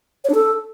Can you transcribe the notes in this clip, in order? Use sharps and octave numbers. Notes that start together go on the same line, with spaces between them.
C#5
D4
A4